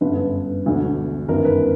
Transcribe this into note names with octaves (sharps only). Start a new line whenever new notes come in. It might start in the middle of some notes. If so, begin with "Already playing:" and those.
G1 F#2 D3 B4
E1 D2 D3
G1 F#2 D#3 A#4
B4